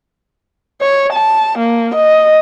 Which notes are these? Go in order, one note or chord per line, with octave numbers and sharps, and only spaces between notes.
C#5
A5
A#3
D#5